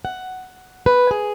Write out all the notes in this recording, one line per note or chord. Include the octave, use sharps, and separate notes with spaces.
F#5
B4
G#4